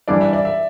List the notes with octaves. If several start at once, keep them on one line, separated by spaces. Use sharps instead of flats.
E3 G3 D4 D5
E5
D5
E5